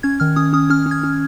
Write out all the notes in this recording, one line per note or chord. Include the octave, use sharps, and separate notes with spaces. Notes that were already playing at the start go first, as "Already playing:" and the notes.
C#4 G#6
D#3 F6
C#4 D#6
C#4 D#6
C#4 F6
C#4
G#6
C#4